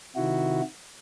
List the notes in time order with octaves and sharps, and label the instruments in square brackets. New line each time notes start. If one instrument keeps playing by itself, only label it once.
[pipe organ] C3 D#3 E4 F#4